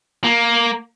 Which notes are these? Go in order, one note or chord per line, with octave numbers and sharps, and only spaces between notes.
A#3